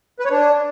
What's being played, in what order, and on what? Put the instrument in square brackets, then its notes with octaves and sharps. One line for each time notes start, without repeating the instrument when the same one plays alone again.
[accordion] B4
C#5
D4